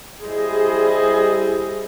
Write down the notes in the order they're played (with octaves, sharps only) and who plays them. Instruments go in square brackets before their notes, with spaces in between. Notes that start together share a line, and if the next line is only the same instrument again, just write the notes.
[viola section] G3 E4 G#4 C5 D#5